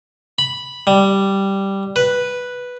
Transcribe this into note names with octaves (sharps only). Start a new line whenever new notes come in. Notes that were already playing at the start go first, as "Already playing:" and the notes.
B5
G3
B4